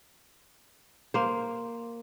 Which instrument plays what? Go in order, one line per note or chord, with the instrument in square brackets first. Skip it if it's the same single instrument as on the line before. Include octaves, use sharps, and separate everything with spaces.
[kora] A#3 C5